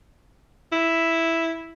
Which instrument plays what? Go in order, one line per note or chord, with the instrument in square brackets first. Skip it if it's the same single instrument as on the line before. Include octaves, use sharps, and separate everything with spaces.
[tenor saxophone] E4